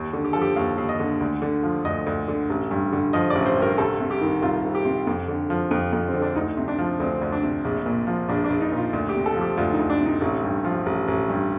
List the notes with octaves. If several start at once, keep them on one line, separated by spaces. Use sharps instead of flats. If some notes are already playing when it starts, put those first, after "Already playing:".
Already playing: D#2
D3
G4
F3 A4
G4
D#2 F5
D#2
D#5
D3
D2
D3
F3
D2 D#5
D2
D3
A1
G2
D3
F3 D#5
D5
A1
C5
G2
A#4
C2 A4
C3
G4
D#3
C2 F4
C2
G4
C3
F2
D3
F3
F2
F2
C4
D3
D4
D2 D#4
C3
D4
F3
D2 C4
D2
D4
C3
A#1
A#2
F3
A#1 D4
D4
A#1
D#4
A#2
F4
D2
G4
C3
A4
F3
G4
D2 F4
D#4
D2
D4
C3 D#4
A1
G2
F3
A1
A1
G2